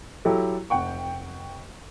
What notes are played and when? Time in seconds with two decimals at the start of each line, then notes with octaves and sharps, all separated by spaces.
0.25 F#3 E4 G4 A4
0.70 F1 F#5 G5 C#6